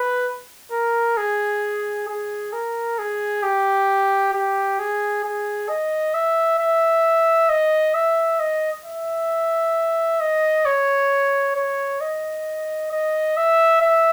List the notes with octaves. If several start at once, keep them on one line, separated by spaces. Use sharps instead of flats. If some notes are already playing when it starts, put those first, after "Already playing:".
Already playing: B4
A#4
G#4
G#4
A#4
G#4
G4
G4
G#4
G#4
D#5
E5
E5
D#5
E5
D#5
E5
D#5
C#5
C#5
D#5
D#5
E5
E5